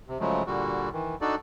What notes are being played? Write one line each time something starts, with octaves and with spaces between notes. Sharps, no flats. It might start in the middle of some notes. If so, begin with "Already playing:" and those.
C3
C#3 F3 F#3 G#3 A3
A#2 D3 G3 F#4
D#3 E3
D4 D#4 F#4 A4 D5